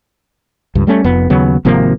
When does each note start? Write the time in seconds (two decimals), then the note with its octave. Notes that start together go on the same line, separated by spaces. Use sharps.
0.75 C#2 G2
0.87 G3 A3 C#4
1.04 F1 F2 B3
1.30 D#2 C#3 F#3 B3
1.65 G#1 C3 F3 A#3